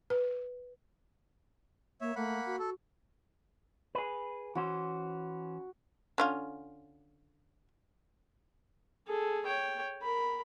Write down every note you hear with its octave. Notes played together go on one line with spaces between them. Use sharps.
B4
A#3 C#5 E5
A3 A#3 F#5 B5
F#4
A4
G#4 B4
E3 C#4 F#4 C5
D3 C#4 F4
G#4 A4
C#5 G5
A#4 B5